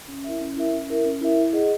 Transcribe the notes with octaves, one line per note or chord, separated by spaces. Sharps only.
C#4
E4 A#4 E5
C#4
E4 A#4 E5
C#4
E4 A#4 E5
C#4
E4 A#4 E5
E4
G#4 D#5 F#5